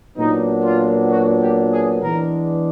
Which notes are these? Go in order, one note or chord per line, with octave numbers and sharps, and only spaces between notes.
A#2 F#3 B3 D4 D#4
F4
F#4
G4
G#4
E3 G#3 B3 D4 A#4